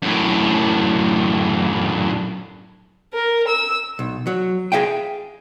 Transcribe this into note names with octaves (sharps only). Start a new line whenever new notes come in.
F#2 A2
A#4
E6
B1
F#3
G#4 E5 F5 G5